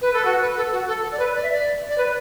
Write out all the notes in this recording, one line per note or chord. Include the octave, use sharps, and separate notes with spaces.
B4
A4
F#4
B4
A4
F#4
A4
A4
D5
B4
D5
E5
D5
D5
B4